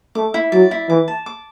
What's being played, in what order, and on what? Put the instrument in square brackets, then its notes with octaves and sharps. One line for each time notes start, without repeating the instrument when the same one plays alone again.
[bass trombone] A3 [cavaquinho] D6
[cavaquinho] E4
[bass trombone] F#3 [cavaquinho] D5
[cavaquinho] E4
[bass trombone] E3 [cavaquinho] D6
[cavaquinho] A5
D6